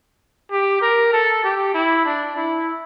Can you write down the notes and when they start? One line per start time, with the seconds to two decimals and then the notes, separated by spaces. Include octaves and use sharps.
0.51 G4
0.82 A#4
1.13 A4
1.44 G4
1.74 E4
2.05 D4
2.36 E4